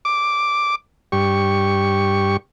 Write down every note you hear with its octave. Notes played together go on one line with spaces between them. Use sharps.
D6
G2 G4 C#6